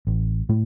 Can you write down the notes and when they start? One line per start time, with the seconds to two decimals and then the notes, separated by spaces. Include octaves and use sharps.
0.07 A1
0.49 A2 A3